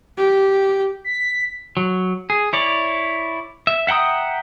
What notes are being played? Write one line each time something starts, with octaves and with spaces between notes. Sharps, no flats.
G4
B6
F#3
G#4
E4 C#5 D5
E5
E5 F#5 G5 A#5 D#6